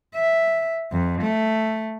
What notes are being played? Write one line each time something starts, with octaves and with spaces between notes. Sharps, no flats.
E5
F2
A3